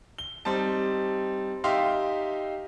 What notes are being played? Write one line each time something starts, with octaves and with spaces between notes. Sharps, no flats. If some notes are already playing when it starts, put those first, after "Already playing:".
G7
G3 C4 D#4 A5
D#4 G4 E5 F5 G5 C6